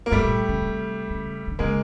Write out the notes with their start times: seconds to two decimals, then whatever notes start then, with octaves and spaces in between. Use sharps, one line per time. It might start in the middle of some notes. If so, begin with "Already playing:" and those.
0.06 A#3
0.11 G#2 G3 A3
0.24 A#2
0.49 C#3
0.61 C3
1.10 C#3
1.47 D3
1.59 C#3 G#3 A#3